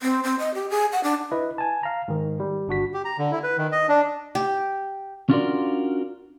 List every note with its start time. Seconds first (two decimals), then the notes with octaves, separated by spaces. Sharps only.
0.02 C4
0.23 C4
0.39 D#5
0.54 G4
0.70 G#4
0.92 F#5
1.03 D4
1.31 E4 B4 D#5
1.58 G#5 A5
1.83 F5 A#5
2.08 G#2 D#3
2.40 G3
2.68 G1 D4 F#4 B6
2.93 G4
3.05 A#5
3.18 D3
3.32 E4
3.43 B4
3.58 D#3
3.72 D#5
3.89 D4
4.35 G4
5.30 C#4 D4 F4 F#4 A#4 D5